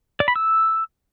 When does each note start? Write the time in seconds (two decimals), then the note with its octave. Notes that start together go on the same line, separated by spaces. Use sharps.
0.20 D5
0.28 B5
0.36 E6